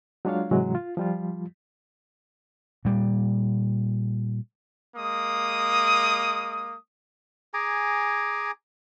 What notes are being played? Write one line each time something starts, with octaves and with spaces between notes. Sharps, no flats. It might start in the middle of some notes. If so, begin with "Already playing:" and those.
F#3 G#3 D4 F4 C#5 F5
G#2 C3 E3 F#3 G#3
F4
F3 G3 F4
A#2 G3
G#3 A#3 D#6
G#4 G#5 A#5 D6